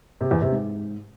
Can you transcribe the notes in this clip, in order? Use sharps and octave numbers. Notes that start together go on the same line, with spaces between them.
C3
E2
C3
G#2